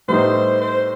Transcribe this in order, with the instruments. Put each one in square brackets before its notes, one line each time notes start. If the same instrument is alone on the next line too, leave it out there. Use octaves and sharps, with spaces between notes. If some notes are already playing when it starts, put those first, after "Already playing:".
[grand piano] A2 G3 B3 D#4 [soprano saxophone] C5
[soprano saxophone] C5